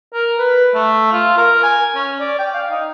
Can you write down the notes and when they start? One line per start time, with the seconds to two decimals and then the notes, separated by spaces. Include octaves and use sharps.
0.13 A#4
0.38 B4
0.75 A3
1.12 F4
1.37 A#4
1.63 G#5
1.95 C#4
2.20 D5
2.39 G5
2.54 F5
2.70 D#4